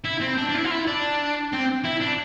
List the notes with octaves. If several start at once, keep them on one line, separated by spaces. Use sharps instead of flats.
E4
C4
D4
D4
E4
F4
E4
D4
C4
E4
D4